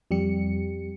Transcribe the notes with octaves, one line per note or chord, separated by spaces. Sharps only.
F2 G3 G4 C#7